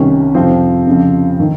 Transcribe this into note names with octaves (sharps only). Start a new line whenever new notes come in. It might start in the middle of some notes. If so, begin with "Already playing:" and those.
Already playing: C2 C3 D#3 C#4
F2 C3 F3 C4
F2 C#3 F3
D#3